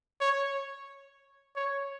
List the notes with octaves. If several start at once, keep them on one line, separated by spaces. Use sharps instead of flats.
C#5
C#5